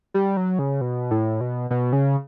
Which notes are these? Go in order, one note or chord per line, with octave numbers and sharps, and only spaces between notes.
G3
F#3
C#3
B2
A2
B2
B2
C#3